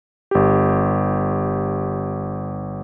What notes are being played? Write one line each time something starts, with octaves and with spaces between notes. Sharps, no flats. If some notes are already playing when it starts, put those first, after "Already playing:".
G1 G4